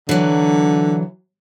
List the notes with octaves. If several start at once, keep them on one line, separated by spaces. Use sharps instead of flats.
D3 E3 F#3